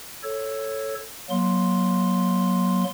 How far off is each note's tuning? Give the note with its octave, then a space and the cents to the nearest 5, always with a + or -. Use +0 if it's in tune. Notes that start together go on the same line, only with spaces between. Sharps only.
A4 +0 C#5 -10
F#3 +0 A#3 +30 C6 +0